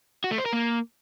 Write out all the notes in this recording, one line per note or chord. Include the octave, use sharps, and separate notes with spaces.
F#4
A3
C5
A#4
A#3